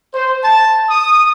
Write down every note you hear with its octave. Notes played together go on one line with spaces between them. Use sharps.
C5
A5
D#6